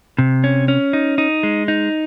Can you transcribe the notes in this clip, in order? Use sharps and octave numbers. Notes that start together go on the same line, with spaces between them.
C3
C#4
C#4
D#4
D#4
G#3
D#4